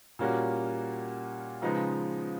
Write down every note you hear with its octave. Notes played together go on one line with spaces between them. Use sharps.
A#2 G3 A#3 C#4 F#4
C#3 F3 G#3 B3 D#4